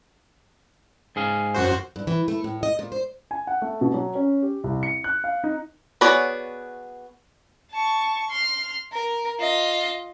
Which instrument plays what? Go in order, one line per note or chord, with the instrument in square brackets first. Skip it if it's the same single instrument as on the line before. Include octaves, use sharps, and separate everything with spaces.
[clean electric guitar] G#2 G#4 F5
[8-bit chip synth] F#2 F#4 C5
[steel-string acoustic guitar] G2
E3
A3
A2
D#5
A#2
C5
[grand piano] G#5
F#5
A3
B2
F#3
C#4
G4
C2
C#7
F#6
F5
D#4
[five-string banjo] B3 F#4 G#4 C#5 D5
[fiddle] A5 C#6
C6 F6
A#4
F4 D#5